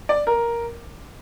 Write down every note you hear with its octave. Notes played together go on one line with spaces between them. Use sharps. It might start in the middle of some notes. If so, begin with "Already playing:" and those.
D5
A#4